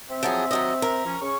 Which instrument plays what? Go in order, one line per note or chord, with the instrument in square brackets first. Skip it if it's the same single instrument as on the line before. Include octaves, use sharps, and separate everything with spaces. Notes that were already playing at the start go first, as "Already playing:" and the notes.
[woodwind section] C4 E5
[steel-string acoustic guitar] F3 F#3 G#4
D#3 F#3 D#5
A#4
[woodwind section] F3 C#4
C#3 C#4 C#6